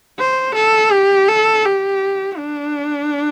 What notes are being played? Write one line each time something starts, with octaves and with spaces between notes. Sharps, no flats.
C5
A4
G4
A4
G4
D4